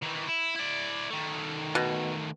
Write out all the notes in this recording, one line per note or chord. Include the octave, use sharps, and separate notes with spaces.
D#3 E3
E4
E4 D5
D#3 A3
B2